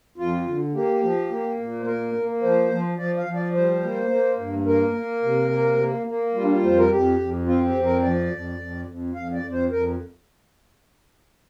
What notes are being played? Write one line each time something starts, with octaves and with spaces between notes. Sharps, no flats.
F2 F4
D3
A#3 G4
F3
A#3
A#2
C5
A#3 A#4
A#3
F3 C5
F3
F3 D5
F5
F3
D5
G3 C5
A#3
A#3
G2
A#3 A#4
A#3
C3
A#3
A#3
A#3
G3 F4
D4
F4
F2 C5
A#4
F2 G4
F2
C4 F4
G4
F2
A#4
F3 D5
F2
F2
F2
F2 F5
D5
F2
C5
F2 A#4